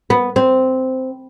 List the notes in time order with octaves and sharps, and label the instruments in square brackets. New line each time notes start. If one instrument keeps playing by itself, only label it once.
[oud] B3
C4